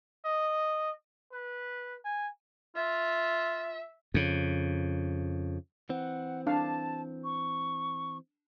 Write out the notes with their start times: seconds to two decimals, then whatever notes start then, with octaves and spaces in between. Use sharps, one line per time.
0.25 D#5
1.32 B4
2.04 G#5
2.76 F4 E5
4.14 F2 C#3
5.90 E3 C4 F#5
6.47 D4 F5 A5
7.24 C#6